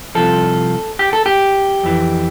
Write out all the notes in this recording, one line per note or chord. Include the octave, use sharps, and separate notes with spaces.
C2 C3 F3 A4
G4
A4
G4
F2 E3